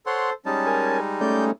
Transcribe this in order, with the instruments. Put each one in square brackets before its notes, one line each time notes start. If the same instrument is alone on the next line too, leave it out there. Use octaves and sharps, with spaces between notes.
[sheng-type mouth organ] A4 C5 [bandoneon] C#5 F#5 C6
[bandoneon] G3 G#3 D#4 [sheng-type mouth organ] C#4 A5
[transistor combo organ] A#4 G#5
[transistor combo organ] A3 C#4 [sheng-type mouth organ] D5 G6